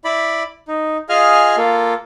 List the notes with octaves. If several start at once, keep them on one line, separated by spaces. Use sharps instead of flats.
E4 D5 B5
D#4
F4 G#4 D#5 F5 G#5 F6
A#3 F4 A4